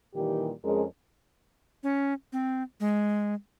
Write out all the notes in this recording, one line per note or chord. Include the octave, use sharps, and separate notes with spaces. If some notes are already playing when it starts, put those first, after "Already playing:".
A#2 D#3 E3 G3 G4
F2 G#3 C#4 G#4 A#4
C#4
C4
G#3